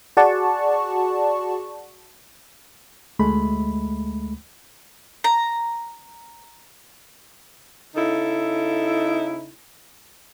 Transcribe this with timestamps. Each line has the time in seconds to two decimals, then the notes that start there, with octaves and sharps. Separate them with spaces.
0.17 F#4 G#4 D5 F#5 A5 C#6
3.19 D2 G#3 A3 B5
5.24 A#5
7.96 C#3 D#4 E4 A4